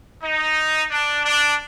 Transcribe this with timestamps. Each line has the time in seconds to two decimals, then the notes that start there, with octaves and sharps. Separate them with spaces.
0.23 D#4
0.91 D4
1.25 D4